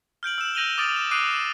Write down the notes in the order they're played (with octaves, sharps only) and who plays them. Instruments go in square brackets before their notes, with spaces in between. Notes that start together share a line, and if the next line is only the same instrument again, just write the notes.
[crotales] F6 G6 D7 F#7
E6 E7
E6 G6 A#6 D#7 F7 G7
D6 D#6 F6 A6 D7
E7
D6 D#6 F#6 C7 D7 D#7